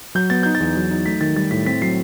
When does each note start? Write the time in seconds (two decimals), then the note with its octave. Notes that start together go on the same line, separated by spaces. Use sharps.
0.15 F#3 G6
0.30 B3 A6
0.43 D#4 G6
0.55 A6
0.60 E2
0.76 F#3
0.91 D#4
1.06 A3 B6
1.21 D#3 A6
1.36 G3 A6
1.51 A2 B6
1.66 C4 B6
1.82 F#3 C7